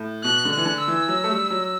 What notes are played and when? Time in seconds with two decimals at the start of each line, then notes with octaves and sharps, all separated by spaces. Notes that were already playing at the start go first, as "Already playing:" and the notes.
Already playing: A2
0.24 B2 F#6
0.45 D3
0.52 F#6
0.57 E3
0.65 D3
0.80 E6
0.88 E3
1.08 F#3
1.24 A3
1.30 G3
1.50 F#3